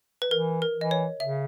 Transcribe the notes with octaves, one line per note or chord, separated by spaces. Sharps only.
B4
E3 A#4
A#4
E3
D#5
C#5
C#3 E5